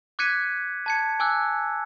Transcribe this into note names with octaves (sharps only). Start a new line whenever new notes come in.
D6 F#6 G#6 B6 C#7 D#7
A5 G#6 C#7
G#5 D6 E6 F#6